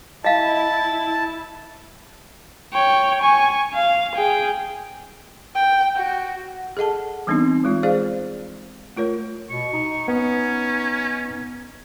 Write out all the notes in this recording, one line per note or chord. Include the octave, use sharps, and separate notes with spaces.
E4 D#5 F5 A5
C#5 G5
G#5 C#6
F5
G#4 G5
G5
F#4
G#4 A4 D#5 F#5 A5
E3 G3 B3 C4 D4 D#4
E3 G#3 F4
G#4 C5 D5 F5
A3 F4 A#4 C#5
B2 C#6
D#4
B3 C#4